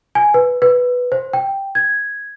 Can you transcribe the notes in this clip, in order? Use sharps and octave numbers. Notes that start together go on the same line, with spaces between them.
G#5
B4
B4
C5
G5
G#6